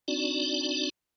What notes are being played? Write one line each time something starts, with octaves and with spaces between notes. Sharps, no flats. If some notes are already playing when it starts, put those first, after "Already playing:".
C4 D4 D#4 F#4 D5